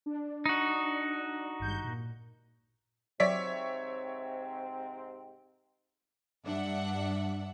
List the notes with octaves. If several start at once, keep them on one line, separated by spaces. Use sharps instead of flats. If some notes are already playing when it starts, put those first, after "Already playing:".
D4
D#4 F#4
G#1 G2 G6
A#2
G#2 C3 F#3 C4 C#5 D5 E5 B6
G2 D4 E5 F#5